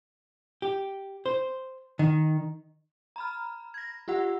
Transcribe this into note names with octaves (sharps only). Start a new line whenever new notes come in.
G4
C5
D#3
A#5 B5 F6
G#6 A#6
F4 G4 F#5 E6